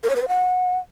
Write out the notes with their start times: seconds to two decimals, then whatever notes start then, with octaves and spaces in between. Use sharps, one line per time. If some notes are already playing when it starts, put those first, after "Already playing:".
0.03 A#4
0.10 C#5
0.16 B4
0.22 C5
0.28 F#5